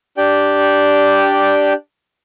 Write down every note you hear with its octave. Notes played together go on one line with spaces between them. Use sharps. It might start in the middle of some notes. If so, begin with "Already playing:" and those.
D4 G4 D5 G5